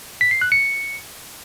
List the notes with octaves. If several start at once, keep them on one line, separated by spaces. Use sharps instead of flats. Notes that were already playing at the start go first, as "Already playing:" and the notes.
B6
C7
F#6
C#7